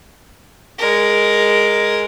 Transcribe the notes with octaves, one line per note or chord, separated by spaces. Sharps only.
G#3 A#4